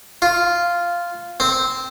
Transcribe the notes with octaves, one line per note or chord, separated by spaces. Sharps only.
F4
C4